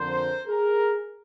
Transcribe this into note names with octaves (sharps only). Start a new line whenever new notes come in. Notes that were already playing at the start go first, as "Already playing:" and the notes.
Already playing: F2 D3 F3 A#4 C5
G#4 A#4